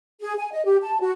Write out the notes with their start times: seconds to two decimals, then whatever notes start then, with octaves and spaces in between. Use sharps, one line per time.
0.21 G#4
0.39 G#5
0.52 D#5
0.65 G4
0.83 A5
1.00 F#4